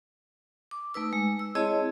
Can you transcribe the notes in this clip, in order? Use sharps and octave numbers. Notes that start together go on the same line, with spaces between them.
D6
A3 D#4 B4 E6
G#3
E6
C4 E4 G#4 C#5 D#5 A5